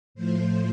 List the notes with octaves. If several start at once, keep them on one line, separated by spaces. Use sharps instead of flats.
A2 F3 A3 C5